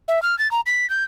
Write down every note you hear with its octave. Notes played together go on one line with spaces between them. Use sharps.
E5
F6
A6
A#5
B6
G6